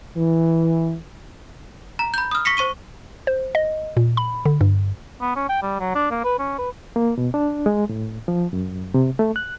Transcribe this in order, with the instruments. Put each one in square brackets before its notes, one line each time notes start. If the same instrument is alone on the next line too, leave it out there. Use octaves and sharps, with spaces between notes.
[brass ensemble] E3
[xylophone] A#5
B5 G6
D#6 F6
C#6 A#6 B6 C#7
C5 C#6 D#7 G7
[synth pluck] C5
D#5
A#2
B5
D3
G2
[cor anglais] B3
C#4
G5
G3
F#3
D4
A#3
B4
C#4
B4
[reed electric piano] A#3
B2
D4
G#3
A2
F3
F#2
C3
A3
F#6